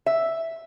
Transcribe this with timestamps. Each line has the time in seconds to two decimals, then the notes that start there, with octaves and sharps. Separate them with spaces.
0.06 E5